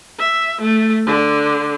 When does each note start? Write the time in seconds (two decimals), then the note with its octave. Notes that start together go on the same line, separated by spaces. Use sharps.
0.19 E5
0.61 A3
1.06 D3